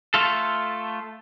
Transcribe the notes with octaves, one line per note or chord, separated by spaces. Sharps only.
A3 F4 A4